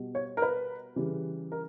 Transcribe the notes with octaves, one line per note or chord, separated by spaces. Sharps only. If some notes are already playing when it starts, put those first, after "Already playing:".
Already playing: B2 G3
C#5
A#4
B4
C#3 E3 G3
A#4